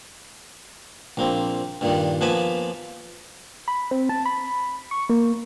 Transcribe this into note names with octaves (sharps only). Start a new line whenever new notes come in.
A#1 A#3 C4
G2 A#2 D#3 G3
F3 A#3 B3 G#5 A5 B5
B5
C4
A5
B5
C#6
A#3